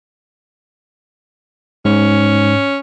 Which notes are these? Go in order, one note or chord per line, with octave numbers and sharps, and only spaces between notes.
G#2 C#4